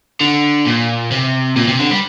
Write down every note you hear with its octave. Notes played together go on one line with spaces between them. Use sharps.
D3
A#2
C3
A#2
C3
D3
G3